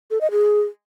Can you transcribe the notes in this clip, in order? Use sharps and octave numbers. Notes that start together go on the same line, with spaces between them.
A4
D#5
G#4